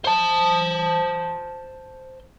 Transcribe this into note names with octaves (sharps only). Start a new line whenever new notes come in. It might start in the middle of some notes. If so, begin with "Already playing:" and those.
C5 A5